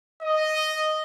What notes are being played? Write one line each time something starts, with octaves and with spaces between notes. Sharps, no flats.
D#5